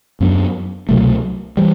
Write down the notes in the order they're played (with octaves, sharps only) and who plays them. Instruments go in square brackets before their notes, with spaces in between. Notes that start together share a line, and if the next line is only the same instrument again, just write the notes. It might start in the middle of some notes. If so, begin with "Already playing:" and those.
[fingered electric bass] F#2 F#3 B3 D4
C2 B2 F#3 A3
E3 G3